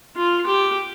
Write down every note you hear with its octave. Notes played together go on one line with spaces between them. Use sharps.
F4
G4